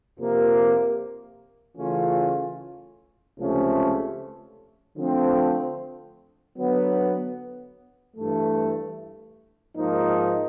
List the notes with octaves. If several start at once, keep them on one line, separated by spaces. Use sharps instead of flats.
F2 C3 F3 A#3
C#3 E3 A3 C#4 F4
C#2 C3 F3 A3 C#4
D3 F3 A3 C4
D3 F#3 B3
G2 E3 A3
G#2 F3 A#3 D#4